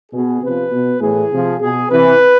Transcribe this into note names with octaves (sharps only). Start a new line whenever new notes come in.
B2 G#4
C3 F3 B4
B2
A2 E3 G#4
C3 F3
B2 G#4
C3 E3 B4